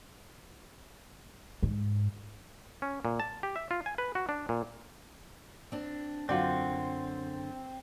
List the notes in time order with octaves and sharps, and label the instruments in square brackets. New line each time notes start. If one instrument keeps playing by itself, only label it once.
[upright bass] G#2
[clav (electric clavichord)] C#4
A#2
A5
G4
E5
F4
G#5
B4
F#4
D4
A#2
[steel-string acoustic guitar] C4 D4
[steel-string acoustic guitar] F#2 D3 [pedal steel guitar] C4 [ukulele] F4 F#4 D5